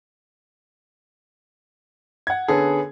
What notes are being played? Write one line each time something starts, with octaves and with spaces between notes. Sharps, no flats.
F#5 G#6
D3 B3 C#4 G#4 A4